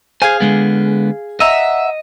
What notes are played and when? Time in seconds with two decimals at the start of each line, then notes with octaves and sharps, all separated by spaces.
0.22 G#4 C5 F5 G#5
0.40 D3 G#3 B3
1.40 D#5 E5 F#5 A#5